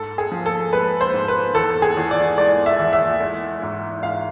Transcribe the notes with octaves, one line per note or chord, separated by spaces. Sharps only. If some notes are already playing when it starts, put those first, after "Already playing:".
Already playing: G#2 A4
G#4
F3
A4
G#3 B4
C5
G#2
B4
E2 A4
G#4
E2
D5
G#3 D5
E5
E2
E5
G#3
G#2
G#2 F5